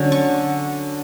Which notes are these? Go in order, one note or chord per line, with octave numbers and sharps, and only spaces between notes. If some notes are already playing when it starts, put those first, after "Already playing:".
Already playing: D3 F#3 C#4
C#6